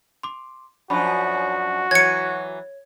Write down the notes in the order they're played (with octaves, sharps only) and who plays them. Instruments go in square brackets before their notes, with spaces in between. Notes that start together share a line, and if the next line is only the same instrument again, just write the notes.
[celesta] C6 D6
[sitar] F#2 F3 D4 [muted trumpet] F#4 [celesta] B5
[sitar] E3 F#3 [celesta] C#5 [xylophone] G#6 C#7